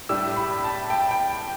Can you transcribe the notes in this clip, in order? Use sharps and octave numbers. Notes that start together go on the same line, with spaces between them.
A2 G3 D4 E6
B5
A5
G5
A5
G5